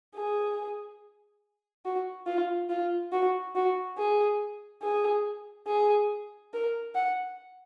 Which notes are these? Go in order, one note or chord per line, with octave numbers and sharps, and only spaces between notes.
G#4
F#4
F4
F4
F#4
F#4
G#4
G#4
G#4
A#4
F#5